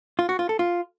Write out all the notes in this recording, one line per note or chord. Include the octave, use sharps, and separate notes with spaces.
F4
F#4
F4
A4
F4